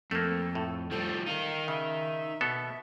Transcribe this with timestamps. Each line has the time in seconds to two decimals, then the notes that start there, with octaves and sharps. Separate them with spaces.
0.11 F2 A3 A#3 A4
0.55 A2
0.92 F3 G3 A4
1.27 D#4 A#4 F5
1.68 C#3 E5
2.41 B2 B3 A4